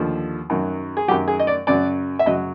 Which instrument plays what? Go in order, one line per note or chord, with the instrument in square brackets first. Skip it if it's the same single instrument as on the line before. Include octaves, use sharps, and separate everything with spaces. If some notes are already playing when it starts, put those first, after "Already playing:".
Already playing: [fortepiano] D#2 D3 F3
F#2 D#3 F#3
G#4
F#2 D#3 F#3 G4
G#4
D#5
D5
F#2 C#3 F#3 D5
E5
F#2 C#3 F#3 D#5